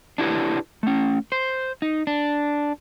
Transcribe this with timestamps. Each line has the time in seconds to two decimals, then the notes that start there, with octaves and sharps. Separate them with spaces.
0.18 D4 E4 G4 B4
0.83 A3 C#4
1.32 C5
1.82 D#4
2.07 D4